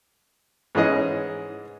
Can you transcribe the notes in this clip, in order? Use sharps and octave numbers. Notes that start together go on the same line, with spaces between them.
G#2 E3 C#4 G#4 D#5